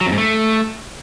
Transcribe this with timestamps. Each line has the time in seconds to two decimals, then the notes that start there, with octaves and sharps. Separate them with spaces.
0.01 F#3
0.06 F2
0.12 G#2
0.18 A3